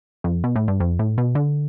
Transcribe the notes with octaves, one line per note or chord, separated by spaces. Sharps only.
F2
B2
A2
G2
F2
A2
B2
D3